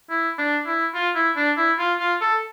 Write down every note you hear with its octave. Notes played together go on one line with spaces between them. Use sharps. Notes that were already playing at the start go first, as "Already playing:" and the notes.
E4
D4
E4
F4
E4
D4
E4
F4
F4
A4